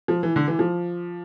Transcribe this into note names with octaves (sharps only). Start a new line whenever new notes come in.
F3
E3
D3
E3
F3